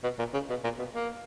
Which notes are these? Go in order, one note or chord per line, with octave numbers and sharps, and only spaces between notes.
B2
A#2
C#3
B2
A#2
B2
A#3